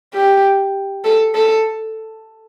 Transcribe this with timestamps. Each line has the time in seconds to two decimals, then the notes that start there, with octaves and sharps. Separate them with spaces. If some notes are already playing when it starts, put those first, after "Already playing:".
0.14 G4
1.05 A4
1.35 A4